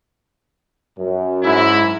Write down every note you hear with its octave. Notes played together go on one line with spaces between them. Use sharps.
F#2
G#2 E4